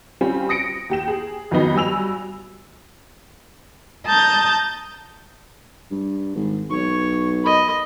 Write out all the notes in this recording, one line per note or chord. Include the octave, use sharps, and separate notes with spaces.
G3 C4 C#4 F4
D#6 A#6 C#7 D7
D#2 G4 E7
G#4
F2 D#3 F#3 B3 D#4
G2 F#3 G#5 E6 F7
A5 A#5 D#6 G6 A6
G2
G#1
B1 C#5 C#6
D#5 B5